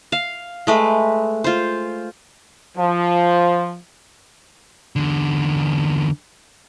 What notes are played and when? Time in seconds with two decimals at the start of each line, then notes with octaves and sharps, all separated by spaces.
0.12 F5
0.67 G#3 A3 B4
1.44 F4 C5
2.77 F3
4.96 E2 D3